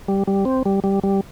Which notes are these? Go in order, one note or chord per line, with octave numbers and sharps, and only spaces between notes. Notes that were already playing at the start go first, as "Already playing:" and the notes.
G3
G3
C4
G3
G3
G3